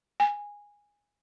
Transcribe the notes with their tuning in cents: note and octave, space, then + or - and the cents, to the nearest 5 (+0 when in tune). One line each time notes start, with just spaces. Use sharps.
G#5 -10